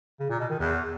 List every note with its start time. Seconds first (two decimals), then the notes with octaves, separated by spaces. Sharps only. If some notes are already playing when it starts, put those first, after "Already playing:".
0.20 C#3
0.30 A#2
0.40 B2
0.50 D#3
0.59 E2